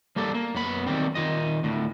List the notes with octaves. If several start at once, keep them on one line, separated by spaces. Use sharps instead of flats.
G3 A#3 G4 A4
A#3
F#2 B3 B5
D#3 G3 C4
D#3 F4 D#5
D2 A2